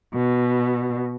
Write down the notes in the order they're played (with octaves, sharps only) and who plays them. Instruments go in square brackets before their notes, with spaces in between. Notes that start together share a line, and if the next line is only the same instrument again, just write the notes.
[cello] B2